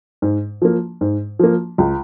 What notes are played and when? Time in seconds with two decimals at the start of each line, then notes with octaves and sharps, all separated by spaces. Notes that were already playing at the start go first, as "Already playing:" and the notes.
0.22 G#2
0.62 F3 A#3
1.01 G#2
1.39 F3 A#3
1.78 C#2